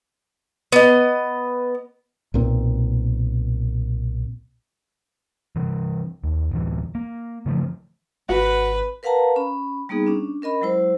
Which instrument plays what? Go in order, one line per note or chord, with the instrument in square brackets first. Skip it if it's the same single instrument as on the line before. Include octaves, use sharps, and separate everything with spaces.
[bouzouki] B3 D#5
[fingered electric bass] B1 A#2 C4
[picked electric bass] C3 E3
D#2
D1 E3
A#3
C#3 E3 F3 A3
[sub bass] G#1 [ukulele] F#4 [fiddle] B4 [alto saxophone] F#5
[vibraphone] A#4 B4 F5 F#5 A5 A#5
C#4 B5
G3 A#3 B3 D#4 G#4
C#4 D4
C#4 A#4 D#5 B5
F#3 G#3 E4 C5